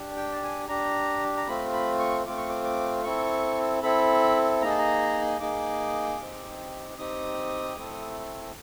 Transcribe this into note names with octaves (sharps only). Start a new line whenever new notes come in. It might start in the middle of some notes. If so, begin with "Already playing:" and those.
Already playing: D4 G4
G5
A5
G#5
D4 G4 A#5
A#5
A3 C4 F4 B5
B5
C#6
A3 C4 F4 D6
C#6
D6
D6
C4 E4 A4 C#6
C4 E4 A4 B5
A#3 D#4 G#4 A#5
A5
A#5
A#3 D#4 G#4 D6
C4 D#4 G4
C4 D#4 G4 D#6
A3 C4 E4 A4